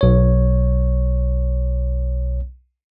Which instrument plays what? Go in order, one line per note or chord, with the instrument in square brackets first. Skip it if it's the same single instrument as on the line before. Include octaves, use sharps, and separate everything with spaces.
[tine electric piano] B1 C#5